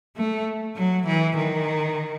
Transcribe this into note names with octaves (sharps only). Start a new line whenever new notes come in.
A3
F#3
E3
D#3